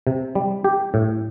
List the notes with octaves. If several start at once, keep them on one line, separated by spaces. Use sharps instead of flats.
C3
G3
G4
A2